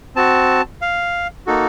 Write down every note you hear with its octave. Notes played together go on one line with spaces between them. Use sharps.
C4 F#4 A5
F5
A#3 D#4 F#4 A4